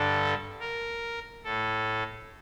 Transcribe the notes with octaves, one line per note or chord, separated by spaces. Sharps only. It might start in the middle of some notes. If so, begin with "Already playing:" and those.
Already playing: G2 D3 A4
A#4
A2 A4